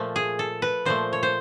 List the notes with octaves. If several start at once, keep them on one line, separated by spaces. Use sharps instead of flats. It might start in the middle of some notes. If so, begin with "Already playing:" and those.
Already playing: A#2 F3 A3
G#4
A4
B4
A#2 F3 A3 C5
C#5
C5